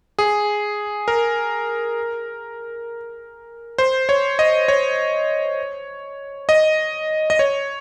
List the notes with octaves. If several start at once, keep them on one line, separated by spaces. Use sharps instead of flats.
G#4
A#4
C5
C#5
D#5
C#5
D#5
D#5
C#5